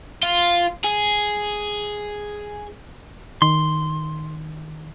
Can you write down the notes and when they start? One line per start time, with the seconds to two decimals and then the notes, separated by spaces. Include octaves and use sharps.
0.23 F4
0.84 G#4
3.42 D#3 C6